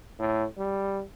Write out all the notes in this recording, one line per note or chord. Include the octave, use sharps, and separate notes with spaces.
A2
G3